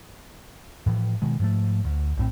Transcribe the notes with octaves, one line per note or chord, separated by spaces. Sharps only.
A2 E3 F3
B2 D#3 G#3
G#2 F3 A3
D2
A#1 A2 C4